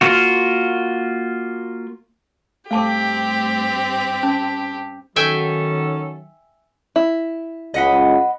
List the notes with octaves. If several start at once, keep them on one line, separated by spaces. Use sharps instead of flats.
A#3 F4 F#4
G2 A3 C4 G4 F5 A5 D6
C#4 A5
D#3 F#3 C#4 A4 E5 G5 G#5
E4
C#2 D#5 F#5 B5